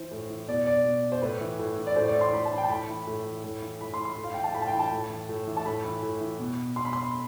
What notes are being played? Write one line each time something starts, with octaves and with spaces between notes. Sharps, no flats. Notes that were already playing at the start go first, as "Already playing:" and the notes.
Already playing: E3 C5
A2
E3
B2 D5
D5
B2
C5
A2 B4
E3
A2
E3
D5
A2 C5
D5
E3
C6
A2 B5
A5
E3
G5
A5
A2 B5
E3
A2
E3
A2
E3
A2 B5
C6
E3
C6
A2
F5
E3 G5
A5
A2 B5
A5
G5
E3
A5
A2
E3
A2
E3
A5
A2 B5
E3
A2
E3
B2
B2 C6
B5
C6